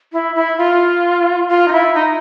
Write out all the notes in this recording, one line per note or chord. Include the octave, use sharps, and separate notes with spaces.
E4
E4
F4
F4
D#4
E4
D#4